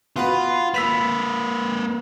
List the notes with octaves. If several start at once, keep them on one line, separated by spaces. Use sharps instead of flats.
B3 F4 F#4 B4
A#3 B4 E6 B6 F7